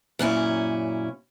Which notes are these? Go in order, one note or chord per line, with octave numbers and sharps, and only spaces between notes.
F#2 A#2 C#4 E4